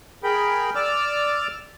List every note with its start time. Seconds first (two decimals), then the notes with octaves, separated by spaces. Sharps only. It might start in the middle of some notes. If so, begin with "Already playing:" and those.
0.24 G#4 A#4 G5 B5
0.75 D5 D6 E6 F6